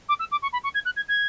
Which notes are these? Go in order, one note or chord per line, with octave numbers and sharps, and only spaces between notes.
D6
E6
D6
C#6
B5
C#6
G#6
F#6
G#6
G#6